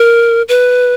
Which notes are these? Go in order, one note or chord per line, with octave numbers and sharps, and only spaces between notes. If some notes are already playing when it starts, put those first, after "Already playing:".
Already playing: A#4
B4